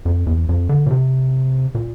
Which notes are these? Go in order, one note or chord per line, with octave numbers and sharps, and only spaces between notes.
F2
E2
F2
D3
A#2
C3
A#2